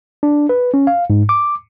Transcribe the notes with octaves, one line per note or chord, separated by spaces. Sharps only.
D4
B4
C#4
F5
G#2
D6